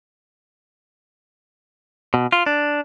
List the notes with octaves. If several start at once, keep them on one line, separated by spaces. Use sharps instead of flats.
B2
F4
D4